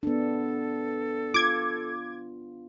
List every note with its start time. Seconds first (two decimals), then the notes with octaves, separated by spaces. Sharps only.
0.03 B3 D4 A4
1.34 F4 D6 G#6